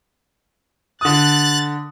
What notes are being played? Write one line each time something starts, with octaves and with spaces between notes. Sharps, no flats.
D3 D#6 F#6 A6